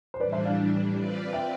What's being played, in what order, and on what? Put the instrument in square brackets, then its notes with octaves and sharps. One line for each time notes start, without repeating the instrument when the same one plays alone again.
[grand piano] C5
[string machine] A2 E3 G3 D4 [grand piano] B4 D5
[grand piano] C5 E5
D5 F5
[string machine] C4 F4 B4 D5
[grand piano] E5 G5